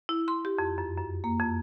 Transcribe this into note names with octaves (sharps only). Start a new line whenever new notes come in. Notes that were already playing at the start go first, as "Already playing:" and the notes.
E4
C6
G4
F2
F#2
F#2
A#3
F2